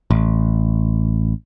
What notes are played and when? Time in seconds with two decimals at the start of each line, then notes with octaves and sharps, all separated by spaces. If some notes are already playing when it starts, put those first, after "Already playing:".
0.11 A1